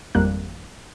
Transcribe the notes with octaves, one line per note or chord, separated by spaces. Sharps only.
G#1 F2 G3 A#3 F#6